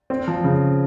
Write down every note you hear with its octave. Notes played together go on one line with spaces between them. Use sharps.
C4
F3
C#3